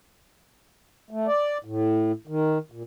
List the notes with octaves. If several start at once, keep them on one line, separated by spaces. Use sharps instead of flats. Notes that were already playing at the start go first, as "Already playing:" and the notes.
A3
D5
A2
D#3
A#2